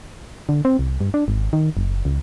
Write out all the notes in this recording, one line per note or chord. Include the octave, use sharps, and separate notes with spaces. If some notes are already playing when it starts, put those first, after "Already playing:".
D3
C4
C2
G2
D4
G#1
D#3
F#1
C#2